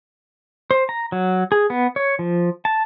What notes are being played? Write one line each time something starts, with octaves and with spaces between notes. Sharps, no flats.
C5
A#5
F#3
G#4
B3
C#5
F3
A5